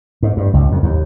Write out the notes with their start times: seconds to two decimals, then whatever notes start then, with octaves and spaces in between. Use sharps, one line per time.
0.23 G#2
0.37 G2
0.54 C#2
0.72 F2
0.83 D#2